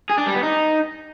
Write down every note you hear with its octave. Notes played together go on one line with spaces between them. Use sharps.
G#4
D4
G3
B3
D#4